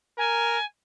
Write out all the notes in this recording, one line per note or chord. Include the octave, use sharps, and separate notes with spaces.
A#4 G#5